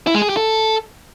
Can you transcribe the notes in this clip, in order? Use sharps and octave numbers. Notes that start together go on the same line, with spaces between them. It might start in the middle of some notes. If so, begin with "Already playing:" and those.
E4
G#3
G#4
G4
A4